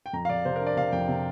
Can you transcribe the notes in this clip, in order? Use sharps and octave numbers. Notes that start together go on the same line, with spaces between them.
G5
F2 A#5
F5
F2 D5
C3 C5
A#4
D4
D5
C3 F5
F2 G5
C3